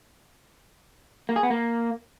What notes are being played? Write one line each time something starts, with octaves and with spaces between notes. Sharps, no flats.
A#3
G#4
B3
A#3